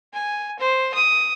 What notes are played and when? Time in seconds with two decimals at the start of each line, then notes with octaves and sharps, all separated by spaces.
0.13 G#5
0.59 C5
0.94 D#6